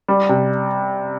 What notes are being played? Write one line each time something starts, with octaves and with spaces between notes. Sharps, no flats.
G3
C3